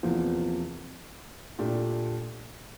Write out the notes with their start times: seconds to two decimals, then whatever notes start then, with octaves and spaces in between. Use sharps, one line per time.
0.03 E2 C3 F3 A#3
1.59 A#2 A3 D4 G4